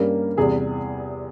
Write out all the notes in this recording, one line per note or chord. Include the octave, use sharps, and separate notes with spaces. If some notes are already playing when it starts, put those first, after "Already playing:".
Already playing: G2 G3 A#3 C#4 A#4
E2 C3 G3 G#4